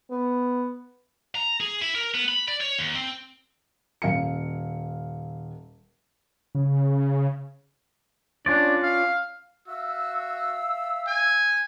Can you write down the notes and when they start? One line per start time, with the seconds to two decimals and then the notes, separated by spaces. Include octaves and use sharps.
0.11 B3
1.35 A#5
1.61 G#4
1.81 E4
1.95 A#4
2.14 B3
2.28 B5
2.48 D5
2.61 C#5
2.79 D#2
2.95 C4
4.02 D#1 F5 C#7
6.55 C#3
8.46 C#4 D4 F4 D5
8.83 F5
9.68 F#4 E5 F5 E6
11.08 G#5